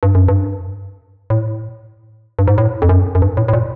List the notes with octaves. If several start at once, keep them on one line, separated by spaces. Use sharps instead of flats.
G2
F#2
G2
A2
G2
G#2
A2
F2
F#2
F#2
G2
A2
A2
A#2